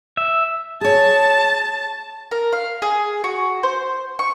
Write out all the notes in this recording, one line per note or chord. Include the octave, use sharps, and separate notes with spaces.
E5
G#4 C#5 A5
A#4
F5
G#4
F#4
C5
C#6